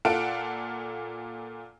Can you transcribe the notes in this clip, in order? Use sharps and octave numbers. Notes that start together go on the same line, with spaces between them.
A#2 F4 A4 F5 F#5 D7